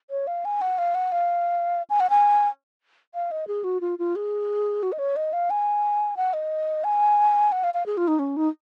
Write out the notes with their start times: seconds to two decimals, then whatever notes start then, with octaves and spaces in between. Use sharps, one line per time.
0.10 C#5
0.27 F5
0.45 G#5
0.61 F#5
0.78 F5
0.95 F#5
1.12 F5
1.90 G#5
2.00 F#5
2.10 G#5
3.15 F5
3.31 D#5
3.48 G#4
3.64 F#4
3.81 F4
3.99 F4
4.16 G#4
4.83 F#4
4.92 D#5
4.99 C#5
5.16 D#5
5.33 F5
5.50 G#5
6.17 F#5
6.33 D#5
6.84 G#5
7.52 F#5
7.64 F5
7.74 F5
7.86 G#4
7.97 F4
8.08 D#4
8.19 C#4
8.37 D#4